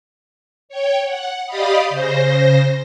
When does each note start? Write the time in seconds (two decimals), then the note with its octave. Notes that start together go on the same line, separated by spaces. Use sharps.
0.69 C#5 G5
1.05 F#5
1.46 G4 D5 D#5 F5 B5 D#6
1.90 C#3 C5 A#6